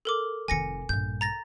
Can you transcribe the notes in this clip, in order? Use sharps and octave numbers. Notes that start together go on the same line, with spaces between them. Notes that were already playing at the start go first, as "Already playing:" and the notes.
A4 A#4 D6
F1 D#3 G#5 A#6 C#7
A#1 G2 G6
A#5 A6 A#6